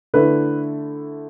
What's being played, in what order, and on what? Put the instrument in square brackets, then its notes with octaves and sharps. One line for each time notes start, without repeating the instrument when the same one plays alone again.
[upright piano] D3 A3 E4 B4